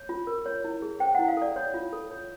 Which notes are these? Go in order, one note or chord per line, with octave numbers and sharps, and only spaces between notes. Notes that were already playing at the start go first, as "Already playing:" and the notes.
Already playing: C#5
F4
A#4
C#5
E4
G#4
C5 G5
F#5
E4
F5
A4 D5
C#5
F4
A4
C#5